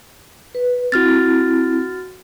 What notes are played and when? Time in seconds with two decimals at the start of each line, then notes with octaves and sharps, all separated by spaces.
0.55 B4
0.92 C4 E4 F#4 F6 A6